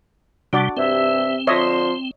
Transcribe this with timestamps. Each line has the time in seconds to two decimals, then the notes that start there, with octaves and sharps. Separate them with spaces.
0.53 C3 G3 D4 F#4 D5
0.77 G2 C3 C4 E5
1.47 D3 F3 C#5 D#5 E5 C6